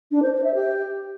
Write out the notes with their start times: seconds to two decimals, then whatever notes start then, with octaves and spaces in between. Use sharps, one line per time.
0.11 D4
0.22 C5
0.33 C5
0.44 E5
0.55 G4